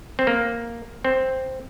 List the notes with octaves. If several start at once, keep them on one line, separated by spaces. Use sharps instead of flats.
C4
A#3
C4